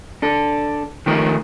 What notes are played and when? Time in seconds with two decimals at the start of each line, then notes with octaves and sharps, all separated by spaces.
0.22 D4 A4
1.06 D#3 F3 A3 A#3 A#4